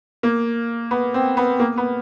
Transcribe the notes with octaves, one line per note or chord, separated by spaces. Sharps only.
A#3
B3
C4
B3
A#3
B3